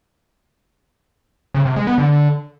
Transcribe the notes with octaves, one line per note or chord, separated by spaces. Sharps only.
C#3
C3
G#3
B3
D3